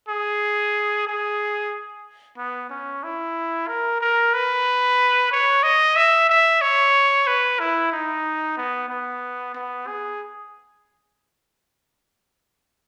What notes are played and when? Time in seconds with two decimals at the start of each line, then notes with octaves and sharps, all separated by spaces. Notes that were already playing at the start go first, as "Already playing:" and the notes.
0.09 G#4
1.07 G#4
2.37 B3
2.70 C#4
3.03 E4
3.68 A#4
4.01 A#4
4.34 B4
5.32 C#5
5.63 D#5
5.96 E5
6.29 E5
6.61 C#5
7.27 B4
7.59 E4
7.92 D#4
8.57 B3
8.89 B3
9.55 B3
9.87 G#4